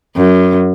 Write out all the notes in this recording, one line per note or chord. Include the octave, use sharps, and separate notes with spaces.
F#2